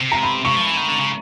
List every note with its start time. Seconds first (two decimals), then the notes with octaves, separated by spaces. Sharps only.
0.01 C3
0.12 A#5
0.23 B5
0.45 C3 C#6
0.56 F3
0.67 E3
0.77 D#3
0.89 D3
0.99 C#3